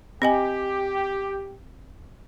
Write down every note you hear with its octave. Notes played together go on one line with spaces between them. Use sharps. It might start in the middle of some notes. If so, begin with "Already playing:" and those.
C4 G4 D#5 G#5